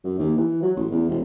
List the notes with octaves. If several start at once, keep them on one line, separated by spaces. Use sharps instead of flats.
F#2
D#2
E3
F#3
A1
E2
E1